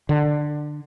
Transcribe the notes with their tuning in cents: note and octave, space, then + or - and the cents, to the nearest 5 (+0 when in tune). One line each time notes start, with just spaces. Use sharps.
D3 +15